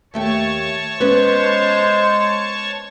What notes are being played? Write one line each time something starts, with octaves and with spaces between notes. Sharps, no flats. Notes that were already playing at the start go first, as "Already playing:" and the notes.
D#2 A3 C#5 G5 A5 C#6
G#3 B3 C#4 B4 C5